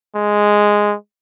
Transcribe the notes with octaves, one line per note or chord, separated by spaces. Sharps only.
G#3